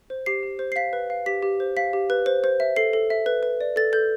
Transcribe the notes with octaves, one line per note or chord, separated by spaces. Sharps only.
C5
G4 C7
G4
C5
C7
F5 B6
B4
F5
G4 B6
G4
C5
F5 B6
G4
B4
C5
C5
E5
A4 C7
A4
E5
B4
B4
D5
A4 A6
A4 G6